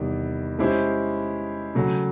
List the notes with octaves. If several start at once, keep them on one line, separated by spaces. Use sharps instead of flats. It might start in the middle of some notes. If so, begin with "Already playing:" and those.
Already playing: E2 C3 D#3 G3
G#3 C#4 E4 G4 C5
C#3 F#3 A3